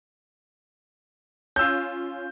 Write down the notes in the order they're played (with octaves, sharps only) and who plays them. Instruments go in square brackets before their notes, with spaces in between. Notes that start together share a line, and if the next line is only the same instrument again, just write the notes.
[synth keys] C#4 F4 [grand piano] E6 G6